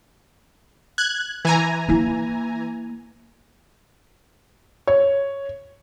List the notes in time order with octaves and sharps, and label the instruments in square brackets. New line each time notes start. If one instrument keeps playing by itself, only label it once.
[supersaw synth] F#6 G#6
E3 G#5 A#5
[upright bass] A#3 E4
[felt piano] C#5